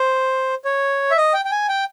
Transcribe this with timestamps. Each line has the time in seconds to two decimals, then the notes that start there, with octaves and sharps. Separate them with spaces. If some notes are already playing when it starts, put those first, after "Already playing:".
Already playing: C5
0.65 C#5
1.11 E5
1.17 D#5
1.34 G5
1.45 G5
1.51 G#5
1.69 G5